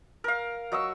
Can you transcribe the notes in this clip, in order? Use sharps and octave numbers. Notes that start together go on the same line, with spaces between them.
A#4 F5
F#3 D#5 C#6 E6